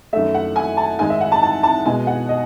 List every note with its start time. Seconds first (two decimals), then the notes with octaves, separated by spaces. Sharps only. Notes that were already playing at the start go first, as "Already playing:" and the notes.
0.13 F#2 D#3 A3 E5
0.34 F#5
0.56 G#5
0.77 A5
0.99 G#2 D#3 G#3 G#5
1.10 E5
1.21 F#5
1.32 A5
1.43 A5
1.63 A5
1.86 B2 G#3 G#5
2.07 F#5
2.29 D#5